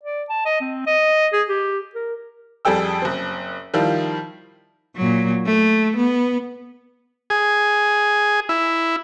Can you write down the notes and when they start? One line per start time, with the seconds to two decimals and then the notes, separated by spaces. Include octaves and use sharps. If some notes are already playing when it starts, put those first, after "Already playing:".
0.03 D5
0.29 A5
0.45 D#5
0.60 C4
0.86 D#5
1.33 G#4
1.48 G4
1.95 A#4
2.65 F2 G3 G#4 A4 G5 E6
3.02 F#1 C4
3.74 D#3 F3 G3 E4 F4
4.96 A#2 F#3
5.46 A3
5.96 B3
7.30 G#4
8.49 E4